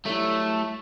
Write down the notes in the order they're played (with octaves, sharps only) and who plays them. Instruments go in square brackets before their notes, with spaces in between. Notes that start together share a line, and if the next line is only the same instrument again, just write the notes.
[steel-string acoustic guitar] F#3 G3 E4 [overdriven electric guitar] A3